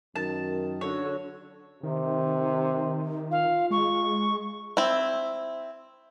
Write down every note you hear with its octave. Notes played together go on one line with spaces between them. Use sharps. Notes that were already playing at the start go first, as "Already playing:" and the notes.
F#2 D#3 A5
D3 F#4 C#5
C3 D#3
F4 F5
G#3 C#6
C4 E4